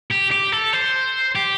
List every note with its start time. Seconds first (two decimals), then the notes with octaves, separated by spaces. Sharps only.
0.11 G4
0.31 G4
0.52 A4
0.73 C5
1.35 G4